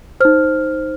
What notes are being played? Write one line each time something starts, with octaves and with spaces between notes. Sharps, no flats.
D#4 C5 F6